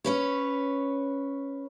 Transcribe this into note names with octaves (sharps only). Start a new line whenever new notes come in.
C#4 B4 C#5